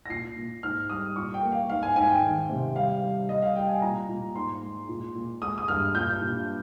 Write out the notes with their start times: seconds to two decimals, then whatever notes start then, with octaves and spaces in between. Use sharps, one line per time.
0.06 A#6
0.09 A#2 C7
0.37 A#2
0.63 G#2 F6
0.90 G3 D#6
1.16 A#2 C#6
1.34 G5
1.43 A#3
1.52 F5
1.69 G#2 F5
1.83 G#5
1.96 G#2 G#5
2.09 G5
2.23 D#3
2.50 C3
2.76 G3 F5
3.02 G3
3.29 G3 D#5
3.42 F5
3.56 G3 G5
3.69 G#5
3.82 A#2 A#5
4.08 A#2
4.35 G#2 C6
4.62 G#3
4.89 A#2
5.15 A#2
5.42 G#3 D#6
5.58 D#6
5.68 G2 F6
5.95 A#2 G6
6.21 A#2